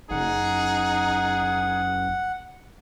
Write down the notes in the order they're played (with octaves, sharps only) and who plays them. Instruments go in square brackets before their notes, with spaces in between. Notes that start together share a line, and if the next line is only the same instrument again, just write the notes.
[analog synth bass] F#1 [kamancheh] D#4 [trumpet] G#4 [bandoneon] F#5